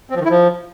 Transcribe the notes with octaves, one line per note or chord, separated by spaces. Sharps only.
C4
F3
D#3
E4
F3